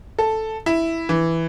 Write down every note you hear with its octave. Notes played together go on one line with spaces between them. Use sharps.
A4
E4
E3